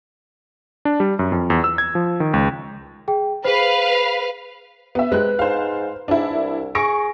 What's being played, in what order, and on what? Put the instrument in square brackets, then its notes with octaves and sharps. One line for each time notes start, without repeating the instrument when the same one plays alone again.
[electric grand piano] D4
G3
F#2
F2
E2
E6
G#6
F3
D#3
C#2
[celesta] G#4 G5
[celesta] G#4 C5 [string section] B4 F5
[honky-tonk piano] B3 E5
[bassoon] C3 [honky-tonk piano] G#3 F#6 [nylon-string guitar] B4
[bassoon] G#2 [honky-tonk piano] C5 F5
[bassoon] G#2 [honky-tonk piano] D4 E4
[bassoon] C2
[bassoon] G#4 [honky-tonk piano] C#6 A#6 D7